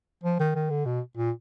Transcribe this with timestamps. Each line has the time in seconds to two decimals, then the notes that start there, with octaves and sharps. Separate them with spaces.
0.23 F3
0.40 D#3
0.55 D#3
0.70 D3
0.86 B2
1.17 A#2